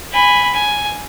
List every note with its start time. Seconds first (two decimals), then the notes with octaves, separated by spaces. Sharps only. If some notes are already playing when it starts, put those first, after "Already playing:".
0.12 G#5 B5
0.54 G#5